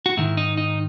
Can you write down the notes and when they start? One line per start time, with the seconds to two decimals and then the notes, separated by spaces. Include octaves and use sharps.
0.06 F#4
0.17 G#2 D#3 E4
0.37 D#4
0.57 D#4